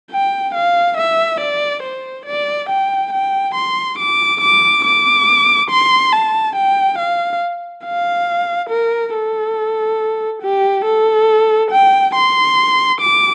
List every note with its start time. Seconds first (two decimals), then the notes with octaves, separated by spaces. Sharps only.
0.11 G5
0.54 F5
0.98 E5
1.40 D5
1.83 C5
2.26 D5
2.69 G5
3.12 G5
3.55 C6
3.98 D6
4.41 D6
4.85 D6
5.70 C6
6.12 A5
6.56 G5
6.99 F5
7.85 F5
8.70 A#4
9.14 A4
10.42 G4
10.85 A4
11.71 G5
12.15 C6
13.01 D6